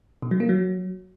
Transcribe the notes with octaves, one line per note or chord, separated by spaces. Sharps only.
B2
F#3
A#3
F#3